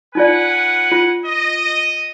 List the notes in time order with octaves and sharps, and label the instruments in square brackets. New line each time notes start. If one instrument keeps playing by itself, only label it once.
[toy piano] D#4 F4 D5 [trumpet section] B4 F#5 G#5
[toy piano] F4
[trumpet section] D#5